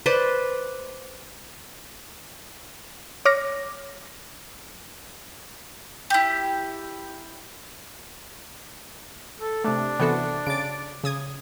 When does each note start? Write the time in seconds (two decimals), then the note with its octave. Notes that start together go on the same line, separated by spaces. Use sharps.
0.06 B4 C5 D5 C6
3.25 C#5 D6 F6 A#6
6.10 E4 G4
9.40 A4
9.65 C3 A3 D4
9.99 C3 E3 B3 F#4 A4
10.47 C#3 A6 D7
11.04 C#3 D#6 G#6